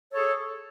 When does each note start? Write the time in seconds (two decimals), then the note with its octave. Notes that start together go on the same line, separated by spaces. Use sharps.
0.12 C#5
0.15 A4
0.17 G#4